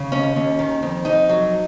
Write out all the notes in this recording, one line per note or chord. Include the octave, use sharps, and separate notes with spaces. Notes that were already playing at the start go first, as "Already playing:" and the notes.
Already playing: C#3
D#2 C#4
D#2
D#3
F2
F2 D#4
F#3